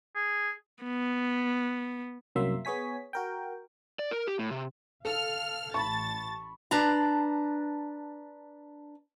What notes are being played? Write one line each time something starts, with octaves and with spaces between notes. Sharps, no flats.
G#4
B3
C2 F#2 F#3 A#3 E5 C6
B3 G#4 C#5 G#5 B6
F#4 A#4 G5
D5
A#4
G4
A2
C3
A4 F5 F6
A1 A5 B5 C#6 A6
D4 B4 A5 A#5